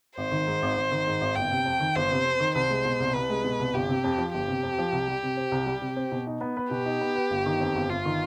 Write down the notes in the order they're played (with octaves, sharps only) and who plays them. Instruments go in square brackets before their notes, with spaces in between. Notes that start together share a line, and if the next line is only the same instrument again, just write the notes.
[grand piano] G#1 [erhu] C5
[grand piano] D#3
G#2
G#1
G#1
D#3
G#2
G#1
[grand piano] G1 [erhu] G5
[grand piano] C3
F2
D#3
[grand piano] G1 [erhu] C5
[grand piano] C3
F2
D#3
[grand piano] C2 [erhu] C5
[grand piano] G#3
B2
C2
[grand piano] C2 [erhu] B4
[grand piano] G#3
B2
C2
[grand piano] G1 [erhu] G4
[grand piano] C3
F2
F3
[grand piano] G1 [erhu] G4
[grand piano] C3
F2
F3
C2
G3
C3
C4
C2
G3
C3
C4
B2
D#4
B3
B4
[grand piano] B2 [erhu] G4
[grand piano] D#4
B3
B4
G1
D#3
F2
G1
[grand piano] G1 [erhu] F4
[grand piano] D#3